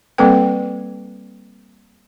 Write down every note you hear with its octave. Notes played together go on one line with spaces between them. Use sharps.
G3 A#3 C4 A4 B4 G5